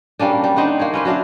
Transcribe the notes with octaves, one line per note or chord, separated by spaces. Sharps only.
G3 A#3 C#4 D4
G3
D4 D#4 C5 F#5
A#3 C#5
C#4 B4 C5
F#3 D4 E5 F5